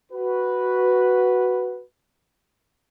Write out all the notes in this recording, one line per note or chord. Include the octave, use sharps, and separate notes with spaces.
F#4 B4